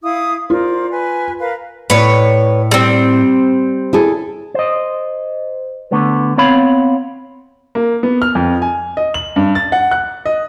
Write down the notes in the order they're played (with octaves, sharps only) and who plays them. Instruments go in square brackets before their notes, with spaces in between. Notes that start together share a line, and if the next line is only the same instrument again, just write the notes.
[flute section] E4 F5 D#6
[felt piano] F4 [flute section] A#4 C5 D5
[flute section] B4 G#5
A#4 B4 F5
[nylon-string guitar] A2 D5 [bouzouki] B4 C#5
[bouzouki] G3 C4
[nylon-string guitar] E4 G#4 A4
[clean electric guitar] C5 D#5
D3 A3 B3
B3 C4 C#5 F5 B5
[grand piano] A#3
B3
F6
F2
G#5
D#5
F#7
G2
A6
F#5
F#6
D#5